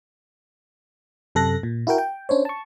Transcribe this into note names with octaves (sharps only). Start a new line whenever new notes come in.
F#2 C3 A4 F#6 A#6
A#2
E4 F#4 A#4 G5
G5
C#4 D4 C5 C#5
A5 C#6